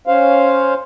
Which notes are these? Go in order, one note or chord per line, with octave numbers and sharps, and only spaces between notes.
C#4 C5 F5